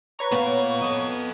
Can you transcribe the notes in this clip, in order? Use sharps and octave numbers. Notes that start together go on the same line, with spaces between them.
B4 C#5 A#5 C#6
A#2 B3 F5
A4 D#5